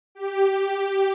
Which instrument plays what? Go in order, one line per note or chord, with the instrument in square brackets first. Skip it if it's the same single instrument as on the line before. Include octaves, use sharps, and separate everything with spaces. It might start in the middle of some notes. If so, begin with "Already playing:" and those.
[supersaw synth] G4